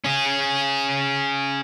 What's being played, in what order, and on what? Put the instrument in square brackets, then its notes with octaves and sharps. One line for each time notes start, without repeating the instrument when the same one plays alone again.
[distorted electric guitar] C#4 G#4